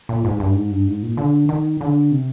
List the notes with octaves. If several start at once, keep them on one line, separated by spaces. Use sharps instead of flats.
A#2
G#2
G2
G#2
G2
G#2
A#2
D3
D#3
D3
C3